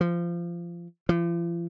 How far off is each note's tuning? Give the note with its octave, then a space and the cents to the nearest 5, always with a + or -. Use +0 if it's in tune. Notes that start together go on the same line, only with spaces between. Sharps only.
F3 -20
F3 -45